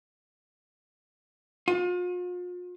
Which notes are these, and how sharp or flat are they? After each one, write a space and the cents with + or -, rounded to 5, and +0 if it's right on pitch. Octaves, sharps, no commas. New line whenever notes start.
F4 +40